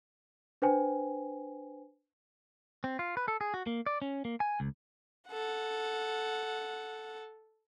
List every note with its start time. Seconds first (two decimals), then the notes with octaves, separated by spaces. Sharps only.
0.62 D4 B4 C5 G5 G#5
2.84 C4
2.99 F4
3.17 B4
3.28 A4
3.41 G#4
3.54 F#4
3.67 A#3
3.86 D5
4.02 C#4
4.25 A#3
4.40 G#5
4.60 C#2
5.30 A4 F#5